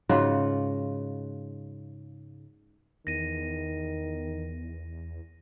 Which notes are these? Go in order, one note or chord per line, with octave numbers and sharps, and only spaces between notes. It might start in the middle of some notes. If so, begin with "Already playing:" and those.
G#2 C#3 F4 F#4
E2 D#3 A#6 D#7